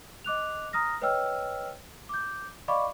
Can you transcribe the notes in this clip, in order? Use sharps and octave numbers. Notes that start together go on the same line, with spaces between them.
D#5 D6 F#6 F7
A#5 D#6 F6 A#6
B4 C#5 D#5 G5 E6 F6
D6 G6
D5 D#5 F5 B5 C#6 D6